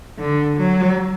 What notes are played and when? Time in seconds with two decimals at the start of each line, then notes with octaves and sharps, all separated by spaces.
0.19 D3
0.58 F#3